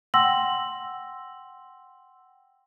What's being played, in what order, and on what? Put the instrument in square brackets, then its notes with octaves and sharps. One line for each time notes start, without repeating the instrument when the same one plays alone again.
[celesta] F#5 G5 C6 E6 A#6 F#7